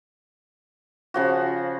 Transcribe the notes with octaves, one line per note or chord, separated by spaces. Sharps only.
C#3 F3 F#4